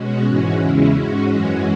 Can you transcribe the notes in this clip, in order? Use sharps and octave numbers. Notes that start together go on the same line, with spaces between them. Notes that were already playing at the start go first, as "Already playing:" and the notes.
Already playing: B2 G#3 C#4 F#4
G#2 E3 G#3 C#4 F#4
E2 C#3 G#3 C#4 E4
G#2 G#3 C#4 F#4
F#2 E3 G#3 C#4 F#4